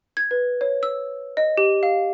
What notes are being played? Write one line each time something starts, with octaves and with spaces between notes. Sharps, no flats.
G#6
B4
C#5
E6
D#5
G4
F5